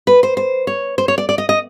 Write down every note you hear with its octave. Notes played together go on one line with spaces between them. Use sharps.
B4
C5
C5
C#5
C5
C#5
D5
D5
D#5
D#5